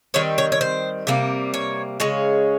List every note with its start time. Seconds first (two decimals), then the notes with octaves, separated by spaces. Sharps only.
0.14 D#3 G3 C4 C#5
0.38 C#5
0.52 C#5
0.61 C5
1.07 C3 G3 A#3
1.54 C#5
2.00 C#3 G#3 C#4